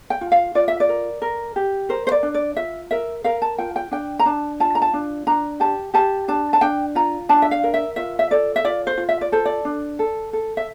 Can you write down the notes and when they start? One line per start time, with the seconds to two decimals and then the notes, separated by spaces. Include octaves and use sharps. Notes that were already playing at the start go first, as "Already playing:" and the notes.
0.10 G5
0.21 F4
0.32 F5
0.55 F4 D5
0.68 E5
0.80 D5
0.89 A#4
1.22 A#4
1.56 G4
1.89 A#4 C5
2.07 C5
2.12 D5
2.23 D4
2.34 D5
2.56 F4 E5
2.91 A#4 E5
3.24 A#4 F5
3.42 A5
3.58 F4 G5
3.76 G5
3.91 D4 G5
4.19 A#5
4.26 D4 A5
4.60 F4 A5
4.75 A#5
4.82 A5
4.94 D4
5.27 D4 A#5
5.60 G4 A5
5.94 G4 A5
6.28 D4 A5
6.53 A5
6.61 D4 G5
6.95 F4 A#5
7.29 D4 A5
7.42 E5
7.51 F5
7.63 A#4
7.74 E5
7.96 F4 E5
8.19 E5
8.31 A4 D5
8.56 E5
8.65 F4 D5
8.87 C5
8.98 F4
9.09 E5
9.21 D5
9.32 A4 C5
9.45 D5
9.65 D4
9.99 A4
10.33 A4
10.57 E5